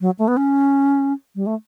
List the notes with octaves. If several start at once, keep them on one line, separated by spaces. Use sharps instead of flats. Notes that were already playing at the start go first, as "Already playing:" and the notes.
F#3
A3
B3
C#4
G3
A3